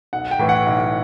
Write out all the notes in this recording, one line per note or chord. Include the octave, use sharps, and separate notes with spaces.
B1 F#5
G5
A2 E3
F#5
B1